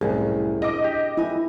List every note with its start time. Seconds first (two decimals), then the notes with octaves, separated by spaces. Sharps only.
0.01 C2 F#2 A2 G#4
0.62 D4 D#5 D6
0.84 G4
1.17 F2 E4 G#5